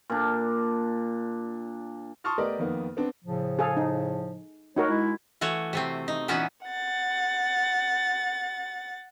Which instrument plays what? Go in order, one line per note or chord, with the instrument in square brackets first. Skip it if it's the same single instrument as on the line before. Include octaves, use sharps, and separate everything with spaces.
[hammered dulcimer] A#2 D4
[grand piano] A5 C6 C#6 D#6 F6 A6
A3 B3 G4 A#4 D5 D#5
F2 D#3 A#3 B3
B3 C4 D4
[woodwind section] A2 C#3 F3
[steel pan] G#4 A4 F5
D#4
[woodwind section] A3 C#5 [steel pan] D#4 F#4 A#4
[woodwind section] G#3 E4
[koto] E3 A3 F#4 C#5
C3 A3 C4
D#4
A#2 E3 B3 C#4 D#4 F#4
[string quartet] F#5 A6